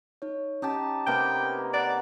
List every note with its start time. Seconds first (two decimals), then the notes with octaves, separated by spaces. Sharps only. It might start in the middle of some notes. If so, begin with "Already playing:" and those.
0.22 D#4 C#5
0.62 C#4 D#4 G4 A5
1.07 C3 A#3 B3 G5
1.74 D5 F#5 A#5 F#6